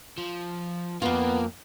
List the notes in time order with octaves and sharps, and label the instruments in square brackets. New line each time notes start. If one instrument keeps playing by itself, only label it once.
[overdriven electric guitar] F3
[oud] F2 F4 [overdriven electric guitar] A#3 [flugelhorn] B3